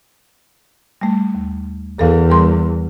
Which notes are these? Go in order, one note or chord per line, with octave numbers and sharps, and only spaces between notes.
G3 A3
D#2
E2 A4 A#4 F5
G3 A#4 C6